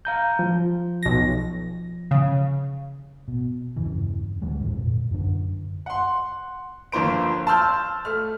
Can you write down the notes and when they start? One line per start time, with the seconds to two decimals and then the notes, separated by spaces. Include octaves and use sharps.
0.05 F5 A#5 G6
0.39 F3
1.03 B1 A#6
2.11 C#3
3.28 B2
3.76 E2 G2 C#3 E3
4.42 D2 D3 G3 G#3
4.61 F2 G#2 D3
4.78 A#2
5.11 F#2 D3 D4
5.86 F#5 C6
6.92 G1 F3 A#3 C5 D7
7.47 A5 C6 E6 F6 G6
8.05 A3 F6